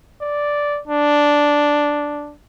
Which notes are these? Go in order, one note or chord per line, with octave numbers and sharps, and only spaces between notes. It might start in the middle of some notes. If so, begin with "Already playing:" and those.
D5
D4